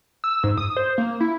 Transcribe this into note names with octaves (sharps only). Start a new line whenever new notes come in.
E6
G#2
D#6
C5
A#3
E4